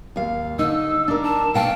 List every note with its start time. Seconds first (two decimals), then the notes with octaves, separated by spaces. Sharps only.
0.16 D#2 F5
0.59 D3 D#4 E6
1.08 D4 A#4
1.23 A5
1.54 B2 F5 G5 A5